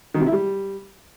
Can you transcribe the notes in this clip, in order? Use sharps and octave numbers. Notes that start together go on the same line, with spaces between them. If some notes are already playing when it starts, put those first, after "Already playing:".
D#3
C3
E4
G3